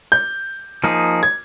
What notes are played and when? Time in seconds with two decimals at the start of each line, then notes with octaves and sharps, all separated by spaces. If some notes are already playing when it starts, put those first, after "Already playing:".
0.12 G6
0.84 F3 A#3 D#4 G#4
1.23 G#6